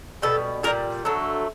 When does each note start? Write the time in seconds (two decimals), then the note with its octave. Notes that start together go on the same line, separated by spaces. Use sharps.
0.22 B2 G3 A4
0.63 A#2 A#4
0.67 G3
1.05 D3 F#3 A3